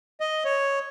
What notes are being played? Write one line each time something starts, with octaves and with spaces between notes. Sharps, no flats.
D#5
C#5